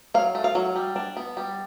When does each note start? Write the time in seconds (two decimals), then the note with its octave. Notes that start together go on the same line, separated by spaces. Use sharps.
0.14 F#3 F5
0.35 A3
0.44 F5
0.55 F#3
0.76 G3
0.96 D4
1.17 B3
1.37 G3